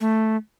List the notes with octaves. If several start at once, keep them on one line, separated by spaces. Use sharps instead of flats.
A3